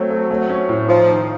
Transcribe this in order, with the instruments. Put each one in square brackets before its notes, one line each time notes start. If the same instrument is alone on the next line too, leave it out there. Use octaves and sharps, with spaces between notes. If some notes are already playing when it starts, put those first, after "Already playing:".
Already playing: [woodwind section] F#3 [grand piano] A3 C4
[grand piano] A3
A3
C#4
A2
[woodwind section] F3 [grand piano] D#4
[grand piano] D#3